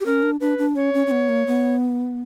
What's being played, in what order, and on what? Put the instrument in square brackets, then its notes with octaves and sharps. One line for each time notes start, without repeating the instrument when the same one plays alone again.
[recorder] G4
[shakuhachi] C#4 [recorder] A#4
[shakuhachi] D4
[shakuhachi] D4 [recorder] B4
[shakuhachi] D4
[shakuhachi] C#4 [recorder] C#5
[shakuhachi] C#4
C#4
B3
A#3
B3